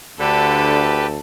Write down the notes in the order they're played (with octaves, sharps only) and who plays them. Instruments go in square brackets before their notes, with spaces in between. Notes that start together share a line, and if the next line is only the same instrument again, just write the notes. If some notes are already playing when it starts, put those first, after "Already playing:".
[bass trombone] D2 [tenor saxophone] D3 [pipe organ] G4 B4 [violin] A4